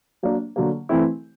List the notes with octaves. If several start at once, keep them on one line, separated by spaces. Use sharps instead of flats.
F#3 A#3 D4
D3 F#3 A#3
E3 A3 C4 E4